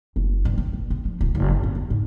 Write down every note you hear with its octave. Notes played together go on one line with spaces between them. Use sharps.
F#1
G2
C4
A#1
B3
F3
D1
F#1
D2
C4
E2
G#2